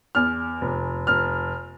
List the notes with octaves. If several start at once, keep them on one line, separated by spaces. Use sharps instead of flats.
E2 F6
F1
F1 F6